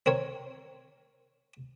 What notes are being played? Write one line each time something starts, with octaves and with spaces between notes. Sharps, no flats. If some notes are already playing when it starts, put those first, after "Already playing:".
C4 A#4 C#5